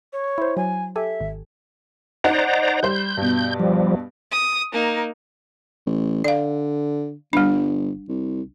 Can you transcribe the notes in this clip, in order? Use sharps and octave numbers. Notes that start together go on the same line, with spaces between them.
C#5
E4 C5
F#3 G#5
G4 A4 E5 G#5
G#1
D#4 C5 D5 F#5 A#5
G3 C5 G6
G2 B2
F3 G3
D#6
A#3 D#4
A1
D3 D5 F5
G1 G3 D4
C2